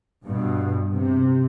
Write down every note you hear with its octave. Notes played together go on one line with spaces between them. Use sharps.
G2 B2
C3